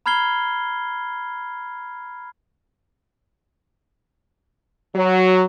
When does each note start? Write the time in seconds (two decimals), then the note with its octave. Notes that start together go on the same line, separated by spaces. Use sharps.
0.06 A#5 B5 F6 G#6 C7 G7
4.95 F#3